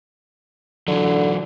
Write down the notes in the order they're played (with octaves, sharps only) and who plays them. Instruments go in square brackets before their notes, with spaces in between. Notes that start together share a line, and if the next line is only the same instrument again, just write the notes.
[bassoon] D3 [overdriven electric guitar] E3 F#3